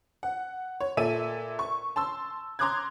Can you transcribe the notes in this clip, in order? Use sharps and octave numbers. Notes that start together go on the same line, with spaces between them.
F#5
C#5
A#2 A4 E5 D#7
C#6
A5 C6 E6
A#5 C6 D6 D#6 F#6 G#6